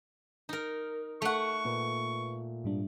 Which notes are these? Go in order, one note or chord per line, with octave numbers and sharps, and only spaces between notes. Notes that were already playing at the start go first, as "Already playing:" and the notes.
D#4 A#4
A3 F#5 C#6
A#2 A#3 B4
G#2 G3 D4